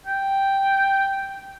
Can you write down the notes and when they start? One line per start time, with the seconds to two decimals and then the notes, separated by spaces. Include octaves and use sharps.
0.07 G5